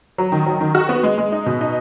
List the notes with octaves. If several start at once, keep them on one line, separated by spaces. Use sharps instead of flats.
F#3
D#3
F#3
D#3
F#4
B3
G#3
G#3
D#4
B2
D#4